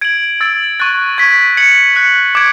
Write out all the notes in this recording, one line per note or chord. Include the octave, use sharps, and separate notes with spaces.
G#6 D7 F#7
E6 A6 D7 F#7
C#6 F#6 A6
C#6 G#6 B6
G#6 C#7 F#7
F#6 C#7 F#7
D6 G#6 D7